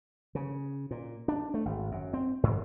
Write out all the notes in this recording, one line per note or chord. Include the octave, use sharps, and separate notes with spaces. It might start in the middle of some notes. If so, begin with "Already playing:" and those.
C#3
A#2
D4
A3
G#1
F#2
C4
G#2